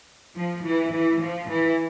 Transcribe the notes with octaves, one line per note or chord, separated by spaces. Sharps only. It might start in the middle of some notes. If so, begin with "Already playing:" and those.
F3
E3
E3
F3
E3